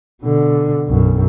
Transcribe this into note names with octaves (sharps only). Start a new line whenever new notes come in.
B2 D3
B1 F#2